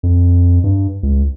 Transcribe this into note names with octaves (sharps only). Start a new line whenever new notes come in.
F2
G2
C#2